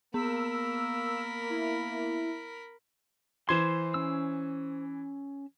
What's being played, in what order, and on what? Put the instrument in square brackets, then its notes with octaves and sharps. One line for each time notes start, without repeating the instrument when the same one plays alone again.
[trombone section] A#3 [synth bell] B3 [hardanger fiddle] A#4 B5 [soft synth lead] E6
[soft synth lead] E4
[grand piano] E3 G#6 [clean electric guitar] C5 C6
[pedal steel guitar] C#4 E6